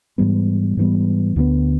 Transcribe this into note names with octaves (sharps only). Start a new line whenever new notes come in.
G#2 E3 G3 B3
G#2 E3 G3 B3
D2 D3 F#3 B3